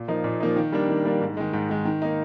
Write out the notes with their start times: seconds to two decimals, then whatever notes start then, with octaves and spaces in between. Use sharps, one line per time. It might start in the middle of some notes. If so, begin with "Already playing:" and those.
Already playing: A#2
0.08 F3 A#3 D#4
0.24 A#2
0.40 F3 A#3 D#4
0.56 D#3
0.72 G3 A#3 D4
0.89 D#3
1.05 G3 A#3 D4
1.21 G#2
1.37 D#3 G#3
1.53 G#2
1.69 D#3 G#3
1.85 D#3
2.02 A#3 D#4